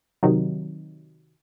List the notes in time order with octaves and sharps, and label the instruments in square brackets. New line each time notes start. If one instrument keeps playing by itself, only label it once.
[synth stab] C3 D#3 F#3